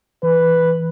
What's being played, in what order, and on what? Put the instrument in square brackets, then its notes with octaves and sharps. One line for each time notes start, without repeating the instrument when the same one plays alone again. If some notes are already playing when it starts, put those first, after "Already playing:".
[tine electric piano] E3 [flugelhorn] B4